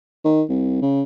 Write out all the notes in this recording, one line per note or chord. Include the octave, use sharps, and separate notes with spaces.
D#3
C2
C#3